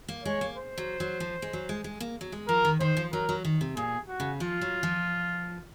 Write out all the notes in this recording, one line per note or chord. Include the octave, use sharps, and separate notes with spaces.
A#3
G#3 C#5
A#3
C5
F#3
F#3
F3
G#3
F#3
G#3
G#3
A#3
F#3
G#3
F3 A#4
D#3
D#3 C5
F3
F#3 A#4
F#3
D#3
C3
A#2 G#4
F#4
C#3
F3 F4
F#3
F3